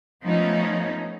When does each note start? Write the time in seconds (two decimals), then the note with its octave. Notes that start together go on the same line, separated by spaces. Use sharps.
0.23 F3 A3 B3 C#4 D#4